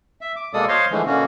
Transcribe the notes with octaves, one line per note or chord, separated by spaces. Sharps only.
E5
D6
B2 G#3 A#3 A4 D5 D#6
C5 C#5 D#5 F5 C6
D3 E3 F3 G#3 A3
B2 D3 A#3 C#4 F#4